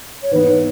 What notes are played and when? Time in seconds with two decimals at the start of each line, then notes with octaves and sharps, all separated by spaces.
0.23 C#5
0.31 G#2 E3 B3 B4